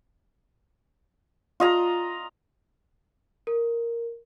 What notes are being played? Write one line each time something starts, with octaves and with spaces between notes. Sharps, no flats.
F4 D#5 A#5
A#4